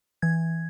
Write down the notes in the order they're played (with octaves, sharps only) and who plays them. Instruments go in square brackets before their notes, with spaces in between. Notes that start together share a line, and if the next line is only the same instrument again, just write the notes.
[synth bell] E3 G#6